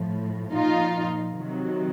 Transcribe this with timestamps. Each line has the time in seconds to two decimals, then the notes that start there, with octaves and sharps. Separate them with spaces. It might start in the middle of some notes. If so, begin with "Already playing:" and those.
Already playing: A2 F3
0.53 A#2 F3 D#4 F4
1.37 C3 D#3 F#3